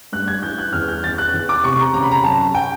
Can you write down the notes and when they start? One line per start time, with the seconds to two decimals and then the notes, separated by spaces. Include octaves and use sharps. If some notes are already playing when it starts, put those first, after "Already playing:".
0.12 G2 F#6
0.28 G#6
0.43 E3 G6
0.58 F#6
0.73 E2 F6
0.88 G6
1.04 E2 A6
1.18 F#6
1.34 E2
1.49 D6
1.64 C3 C#6
1.80 A#5
1.94 C#3 A#5
2.03 B5
2.12 A#5
2.24 F#2 A5
2.55 G5